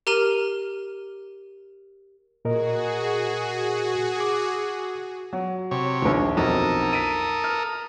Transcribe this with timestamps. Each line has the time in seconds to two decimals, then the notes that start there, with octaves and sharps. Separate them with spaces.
0.07 G4 A#4 A#5 F6 D#7
2.45 A#2 F#4 G#4 A#4 D#5
4.20 D6
5.33 F#3
5.71 C3 C#5
6.02 A#1 D#2
6.37 B1 F2 A4 A#4 D#6
6.93 B6 D7 D#7
7.44 F6